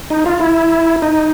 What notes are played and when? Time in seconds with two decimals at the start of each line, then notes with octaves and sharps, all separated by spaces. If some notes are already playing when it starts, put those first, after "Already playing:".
0.10 D#4
0.26 F4
0.41 E4
1.02 D#4